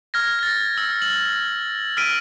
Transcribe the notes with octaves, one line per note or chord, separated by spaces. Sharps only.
F6 G#6 A#6
A6 A#6
E6
F#7
E6 F6 B6 D7 D#7